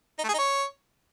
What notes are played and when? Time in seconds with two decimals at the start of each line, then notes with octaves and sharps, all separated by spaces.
0.19 D#4
0.24 A3
0.29 G#4
0.34 D#4
0.39 C#5